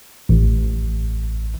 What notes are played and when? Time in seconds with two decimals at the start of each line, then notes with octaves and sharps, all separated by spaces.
0.29 A1